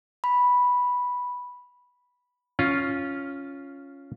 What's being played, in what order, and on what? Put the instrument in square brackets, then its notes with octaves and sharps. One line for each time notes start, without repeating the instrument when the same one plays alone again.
[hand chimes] B5
[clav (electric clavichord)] C#4 F4